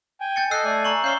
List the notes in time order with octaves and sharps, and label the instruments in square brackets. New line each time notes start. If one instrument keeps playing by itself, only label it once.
[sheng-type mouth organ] G5 G#5
[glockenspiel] G6 A6 C#7
[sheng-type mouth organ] A4 D#5 [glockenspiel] E6 F#6 C7
[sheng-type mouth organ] A3 D5 G#5
[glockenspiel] A#5 C#6 F#7
[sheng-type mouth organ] C#4 F5 E6 [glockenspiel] G6 C7 G7